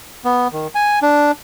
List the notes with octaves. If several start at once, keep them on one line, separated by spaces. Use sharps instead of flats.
B3
D#3
G#5
D4